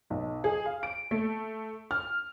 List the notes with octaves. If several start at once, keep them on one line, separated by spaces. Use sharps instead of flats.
B1
G#4
F5
D7
A3
F6